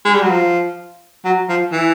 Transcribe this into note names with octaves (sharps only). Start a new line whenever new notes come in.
G#3
G3
F#3
F3
F#3
F3
E3